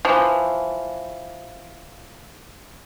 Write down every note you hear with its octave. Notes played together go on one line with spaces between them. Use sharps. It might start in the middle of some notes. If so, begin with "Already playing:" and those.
E3 F3